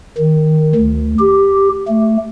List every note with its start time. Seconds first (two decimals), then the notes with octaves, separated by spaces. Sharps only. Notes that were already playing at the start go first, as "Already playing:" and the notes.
0.18 D#3
0.75 D2
1.19 G4
1.88 A3